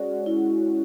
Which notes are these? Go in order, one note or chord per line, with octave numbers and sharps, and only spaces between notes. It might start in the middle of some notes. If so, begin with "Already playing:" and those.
Already playing: G#3 C#4 F#4 D5
E4